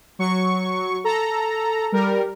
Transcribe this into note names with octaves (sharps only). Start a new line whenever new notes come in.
F#3 C#6
A4 A#5
G3 A#4